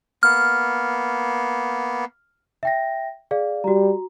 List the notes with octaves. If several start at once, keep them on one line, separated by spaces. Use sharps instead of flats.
A#3 B3 F6
E5 G5 A#6
G#4 D5 F5
G3 F#4 A#5